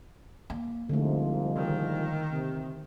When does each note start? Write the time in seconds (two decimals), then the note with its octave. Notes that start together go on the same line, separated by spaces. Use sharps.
0.50 A#3
0.89 C2 G#2 D3 F3 A3
1.57 D#3
2.30 C3